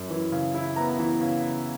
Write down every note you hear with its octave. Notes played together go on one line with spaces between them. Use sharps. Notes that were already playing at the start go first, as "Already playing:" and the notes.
Already playing: F#2
E3
C#3
E4
B3 A#5
E3
C#3